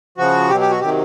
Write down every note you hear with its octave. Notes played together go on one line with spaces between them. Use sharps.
C#3 F3 F#4
B2 F#3 G4
G4
F#4
C3 D#3 F#3 G4